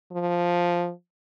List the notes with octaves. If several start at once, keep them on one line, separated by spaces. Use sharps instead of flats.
F3